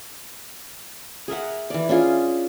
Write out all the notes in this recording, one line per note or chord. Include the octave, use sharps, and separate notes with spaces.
G#4 A#4 E5 F#5
E3 D5
C#4 D4 F4 G#4